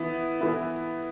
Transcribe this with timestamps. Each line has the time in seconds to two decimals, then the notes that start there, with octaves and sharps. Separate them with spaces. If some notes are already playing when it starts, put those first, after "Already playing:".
Already playing: E3 B3 E4
0.41 E3 B3 E4